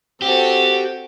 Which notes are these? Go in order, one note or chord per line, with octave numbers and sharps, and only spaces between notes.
C4 F#4 G4 A4